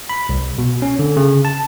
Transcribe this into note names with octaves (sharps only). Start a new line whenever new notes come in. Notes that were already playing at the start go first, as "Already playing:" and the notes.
B5
C2
B2
C#4
D3
C#3
A5